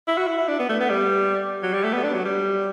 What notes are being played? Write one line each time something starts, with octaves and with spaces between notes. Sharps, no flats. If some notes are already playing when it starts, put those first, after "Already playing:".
E4
F#4
E4
E4
D4
B3
A3
B3
G3
F#3
G3
A3
B3
D4
F#3
G3